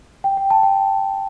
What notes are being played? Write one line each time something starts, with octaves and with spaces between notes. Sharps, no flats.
G5
G5
A5
G5